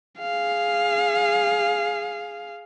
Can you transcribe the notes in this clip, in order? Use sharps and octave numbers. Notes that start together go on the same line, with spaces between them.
G#4 F5